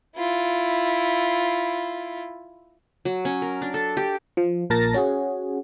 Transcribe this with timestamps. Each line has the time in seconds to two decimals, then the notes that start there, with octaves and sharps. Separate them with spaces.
0.16 E4 F4
3.05 F#3
3.25 C#4
3.42 A#4
3.62 D4
3.74 A4
3.97 G4
4.37 F3
4.70 A#1 A#2 A#4 A5 A6 A#6
4.94 C#4 F#4 G#4